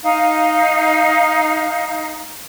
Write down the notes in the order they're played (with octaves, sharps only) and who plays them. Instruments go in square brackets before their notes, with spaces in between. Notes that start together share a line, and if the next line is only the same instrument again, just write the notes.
[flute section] D#4 F5